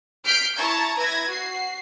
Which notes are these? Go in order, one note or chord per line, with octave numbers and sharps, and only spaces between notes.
F6 G6 B6 C7 D7
E4 A5 A#5 C#6 G#6
E4 B4 G#6 A#6
F#4 C7